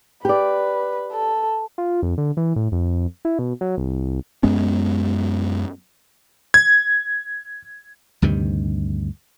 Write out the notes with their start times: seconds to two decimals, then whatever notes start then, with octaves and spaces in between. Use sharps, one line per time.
0.25 G4 B4 D5
1.12 A4
1.78 F4
2.03 F2
2.18 D3
2.37 E3
2.56 A2
2.72 F2
3.25 E4
3.39 B2
3.61 F#3
3.78 C2
4.43 F#2 G#3 B3 C#4
6.54 G#6
8.22 D2 G2 C3 D#3